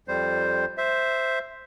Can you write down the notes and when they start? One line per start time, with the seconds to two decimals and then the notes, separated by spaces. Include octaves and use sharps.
0.08 F2 G3 C5
0.78 C5 E5